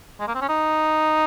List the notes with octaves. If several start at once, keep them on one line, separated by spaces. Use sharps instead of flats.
G#3
A#3
C4
C#4
D#4